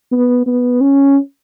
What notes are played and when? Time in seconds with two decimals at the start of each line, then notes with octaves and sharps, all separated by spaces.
0.12 B3
0.47 B3
0.81 C#4